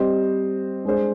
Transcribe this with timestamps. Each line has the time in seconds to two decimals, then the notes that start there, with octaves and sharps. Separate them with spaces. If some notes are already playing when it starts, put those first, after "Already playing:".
Already playing: G3 C4 G4 C5 D#5
0.85 G#3 D4 G#4 C5